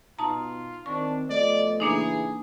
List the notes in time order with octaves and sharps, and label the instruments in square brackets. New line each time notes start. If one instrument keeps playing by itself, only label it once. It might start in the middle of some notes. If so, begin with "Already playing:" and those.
[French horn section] B2 [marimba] D#4 A5 A#5 [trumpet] F4
[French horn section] D#3 C4 [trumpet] D4 [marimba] C#6
[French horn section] B2 F3 D#5 [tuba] A3 [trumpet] D5
[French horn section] A#2 C#3 E3 [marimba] A#3 D4 D#4 [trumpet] G#4